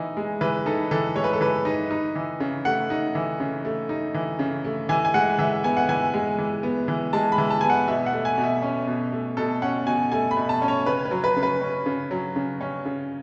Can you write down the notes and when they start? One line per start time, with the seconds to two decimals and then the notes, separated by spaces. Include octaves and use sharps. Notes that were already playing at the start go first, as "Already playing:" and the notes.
Already playing: E3 D#4
0.17 G#3
0.41 E3 B4
0.66 D#4 A4
0.91 E3 A4
1.16 G#3 C#5
1.24 B4
1.33 A4
1.41 E3 B4
1.65 D#4
1.91 D#4
2.16 E3
2.40 C#3
2.65 A3 F#5
2.90 D#4
3.15 E3
3.40 C#3
3.65 A3
3.89 D#4
4.14 E3
4.39 C#3
4.64 A3
4.89 E3 G#5
5.05 G#5
5.14 G#3 F#5
5.39 E3 E5
5.64 B3 G#5
5.77 F#5
5.89 E3 G#5
6.14 G#3
6.38 E3
6.63 B3
6.88 E3
7.13 G#3 A5
7.32 B5
7.38 E3
7.50 A5
7.61 B3 G#5
7.70 F#5
7.88 B2 E5
8.06 F#5
8.12 A3
8.25 G#5
8.38 B2
8.44 E5
8.62 C#4
8.87 B2
9.12 A3
9.37 B2 A4
9.62 C#4 F#5
9.87 B2 G#5
10.12 A3 G#5
10.31 B5
10.37 B2
10.49 A5
10.62 C#4
10.68 C#5
10.86 C#3 B4
11.05 B4
11.11 F#3
11.24 B4
11.36 C#3
11.43 B4
11.61 C#4
11.86 C#3
12.11 F#3
12.36 C#3
12.61 C#4
12.85 C#3